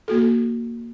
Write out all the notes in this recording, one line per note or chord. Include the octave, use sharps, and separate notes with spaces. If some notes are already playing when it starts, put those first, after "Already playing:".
A#3 F#4 A4